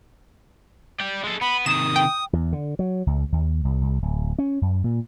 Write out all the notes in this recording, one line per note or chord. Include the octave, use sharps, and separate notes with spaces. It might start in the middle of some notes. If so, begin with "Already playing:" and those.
D5 G5
G#3 A4
B3 B5
C3 D#3 D#6 E7
G5
E2
D3
F#3
C#2
D#2
C2
C2
D1
C#4
F#2
A#2